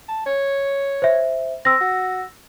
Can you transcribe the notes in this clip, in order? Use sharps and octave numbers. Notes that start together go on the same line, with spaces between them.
A5
C#5
C5 E5
C4 E6 A#6
F#4